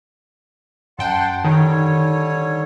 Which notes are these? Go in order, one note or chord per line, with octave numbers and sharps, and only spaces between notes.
F#2 F#5 G5 A5 C6
D3 D#3 G3 C#5